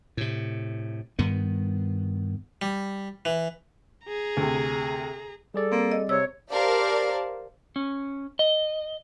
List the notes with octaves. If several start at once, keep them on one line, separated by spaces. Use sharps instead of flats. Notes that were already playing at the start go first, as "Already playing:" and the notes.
A2 C3
G2 D#3 B3
G3
E3
G#4 A#5
D2 C3
G3 G#4 A4 D5
A#3 C4
D#5
C3 C#5 E6
G4 A#4 C5 D5 F5 A5
C#4
D#5